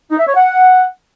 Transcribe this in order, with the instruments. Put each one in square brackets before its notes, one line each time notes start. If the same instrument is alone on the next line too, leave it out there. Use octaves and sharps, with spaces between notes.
[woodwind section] D#4
E5
C#5
F#5